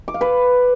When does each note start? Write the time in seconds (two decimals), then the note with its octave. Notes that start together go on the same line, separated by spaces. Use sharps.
0.08 D6
0.14 F5
0.21 B4